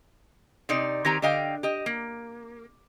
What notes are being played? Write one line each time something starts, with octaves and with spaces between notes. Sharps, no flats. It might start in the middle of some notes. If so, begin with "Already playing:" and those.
C3 D#4 D5
D#3 C4 G4 G#5 A#5
D3 G4 D#5 F5 G5
G4 D#5
A#3